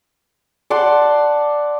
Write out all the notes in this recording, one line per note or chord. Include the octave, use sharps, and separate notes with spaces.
D5 F#5 A5 C6